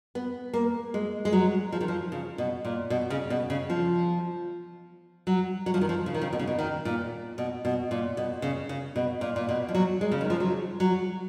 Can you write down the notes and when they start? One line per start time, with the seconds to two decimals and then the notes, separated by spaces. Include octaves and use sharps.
0.15 B3
0.53 A#3
0.94 G#3
1.25 G#3
1.33 F#3
1.72 F3
1.81 D#3
1.88 F3
2.12 C#3
2.38 B2
2.65 A#2
2.90 B2
3.10 C#3
3.30 B2
3.50 C#3
3.70 F3
5.27 F#3
5.66 F#3
5.74 F3
5.81 D#3
5.89 F3
6.06 C#3
6.14 D#3
6.21 C#3
6.33 B2
6.39 C#3
6.47 B2
6.59 D#3
6.85 A#2
7.38 B2
7.65 B2
7.91 A#2
8.17 B2
8.42 C#3
8.69 C#3
8.96 B2
9.21 A#2
9.36 A#2
9.49 B2
9.68 F3
9.75 F#3
10.01 G#3
10.11 C#3
10.21 D#3
10.30 F3
10.40 F#3
10.80 F#3